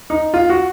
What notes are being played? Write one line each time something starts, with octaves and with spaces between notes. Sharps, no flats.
D#4
F4
F#4